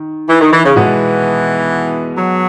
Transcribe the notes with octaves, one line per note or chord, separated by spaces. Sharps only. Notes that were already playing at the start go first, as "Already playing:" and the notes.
Already playing: D#3
E3
D#3
E3
C#3
B2 E3 G#3 B3 F#4
F#3